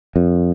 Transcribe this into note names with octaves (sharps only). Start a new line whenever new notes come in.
F2